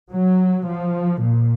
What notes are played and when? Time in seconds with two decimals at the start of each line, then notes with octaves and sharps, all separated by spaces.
0.12 F#3
0.67 F3
1.21 A#2